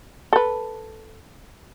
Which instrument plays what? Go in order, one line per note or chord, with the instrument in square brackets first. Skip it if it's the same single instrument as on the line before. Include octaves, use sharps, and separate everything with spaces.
[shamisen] A4 B4